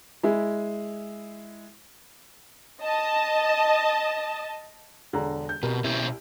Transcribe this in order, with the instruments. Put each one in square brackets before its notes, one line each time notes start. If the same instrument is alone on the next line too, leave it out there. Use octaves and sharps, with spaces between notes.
[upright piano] G#3 E4
[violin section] D#5 A5
[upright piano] E1 G#4 A#5 [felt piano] D3
[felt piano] G6
[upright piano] C2 A#4 [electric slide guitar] B2
[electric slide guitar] B2 C#4 G4 [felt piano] E4